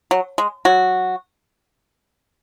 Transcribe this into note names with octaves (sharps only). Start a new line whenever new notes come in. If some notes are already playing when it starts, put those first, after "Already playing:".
F#3
G#3
F#3 F#4